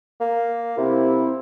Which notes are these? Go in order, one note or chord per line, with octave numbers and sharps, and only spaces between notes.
A#3
C3 C4 E4